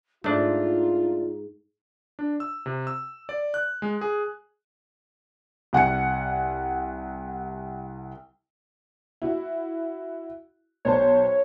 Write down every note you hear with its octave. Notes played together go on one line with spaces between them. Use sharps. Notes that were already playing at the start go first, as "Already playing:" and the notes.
G#2 A3 D4 D#4 F4
D4
E6
C3
E6
D5
F#6
G#3
G#4
C2 F#5 G#5 C#7
E4 F#4
B1 C5 C#5 A5